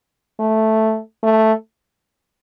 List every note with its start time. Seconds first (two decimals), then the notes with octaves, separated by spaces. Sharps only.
0.40 A3
1.23 A3